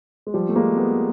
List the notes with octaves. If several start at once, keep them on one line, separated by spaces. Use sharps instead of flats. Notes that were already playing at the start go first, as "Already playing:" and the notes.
G#3
F3 G3
A3
G#3 A#3
A3 B3